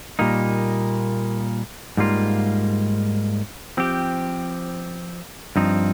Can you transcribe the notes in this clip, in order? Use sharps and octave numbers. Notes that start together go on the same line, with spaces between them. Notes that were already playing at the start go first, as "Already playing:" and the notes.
A#2 G3 A#3 D#4
G#2 G3 A#3 F4
F3 C4 G4
G2 F3 C4 D#4